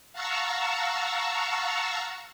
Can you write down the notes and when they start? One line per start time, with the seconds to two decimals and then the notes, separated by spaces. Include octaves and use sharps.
0.13 F5 F#5 A5 A#5 C#6 E6